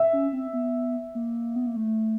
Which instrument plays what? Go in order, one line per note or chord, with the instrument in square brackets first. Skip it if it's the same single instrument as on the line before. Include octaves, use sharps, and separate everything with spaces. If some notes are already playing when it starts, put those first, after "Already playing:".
Already playing: [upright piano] E5
[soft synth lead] C#4
C4
B3
A#3
B3
A#3
A3